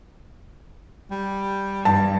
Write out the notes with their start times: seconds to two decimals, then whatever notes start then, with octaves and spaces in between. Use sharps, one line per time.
1.11 G3
1.85 G2 A5